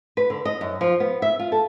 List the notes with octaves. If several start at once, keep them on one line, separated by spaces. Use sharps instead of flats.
B4
D3
D#5
F#2
F3
B3
E5
F4
A4